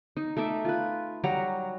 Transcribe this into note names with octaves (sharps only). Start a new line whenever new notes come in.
D#4
A3 D#4 E5 D6
F4 B4
F#3 G3 F#4 A#5